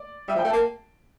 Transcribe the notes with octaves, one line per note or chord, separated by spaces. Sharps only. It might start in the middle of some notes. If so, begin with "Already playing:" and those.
Already playing: D5
G3 E5
F3
G5
A3
A#3 A5